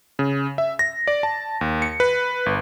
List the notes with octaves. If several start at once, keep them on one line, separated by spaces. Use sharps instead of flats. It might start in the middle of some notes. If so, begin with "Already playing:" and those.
C#3
E5
A#6
D5
A5
D#2
C#7
B4
G1